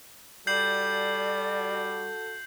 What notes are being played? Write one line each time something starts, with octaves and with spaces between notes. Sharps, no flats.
G3 F#4 A4 D5 G6 C7 F#7